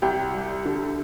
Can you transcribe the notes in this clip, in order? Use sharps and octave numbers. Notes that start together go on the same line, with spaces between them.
C2 G4
G3
D3